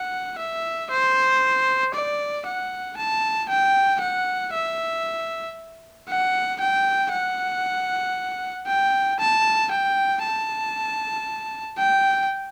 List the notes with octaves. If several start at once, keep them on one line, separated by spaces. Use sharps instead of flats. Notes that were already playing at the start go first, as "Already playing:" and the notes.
Already playing: F#5
E5
C5
D5
F#5
A5
G5
F#5
E5
F#5
G5
F#5
G5
A5
G5
A5
G5